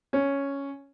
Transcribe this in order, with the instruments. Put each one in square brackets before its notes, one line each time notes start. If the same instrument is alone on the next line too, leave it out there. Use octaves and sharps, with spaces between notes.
[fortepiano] C#4